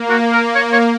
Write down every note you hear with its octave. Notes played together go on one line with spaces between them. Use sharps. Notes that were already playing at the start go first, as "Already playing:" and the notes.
Already playing: A#3
F#4
A#4
C#5
C#5